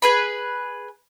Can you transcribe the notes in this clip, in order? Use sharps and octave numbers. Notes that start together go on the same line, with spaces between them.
G#4 B4 B5